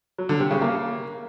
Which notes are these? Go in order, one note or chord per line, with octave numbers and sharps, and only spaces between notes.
F#3
D3
C3
C#3
A#3